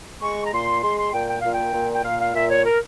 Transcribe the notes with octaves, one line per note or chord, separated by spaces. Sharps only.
G#3 C#6
A#5
A#2 C6
G#3 C6
C6
A#2 G5
G5
A#2 F5
G5
A#2
G5
A#2 F5
F5
A#2 E5
C#5
A#4